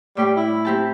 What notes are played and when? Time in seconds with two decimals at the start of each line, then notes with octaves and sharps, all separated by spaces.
0.17 A2 G3
0.37 E4
0.65 C4 G4 A5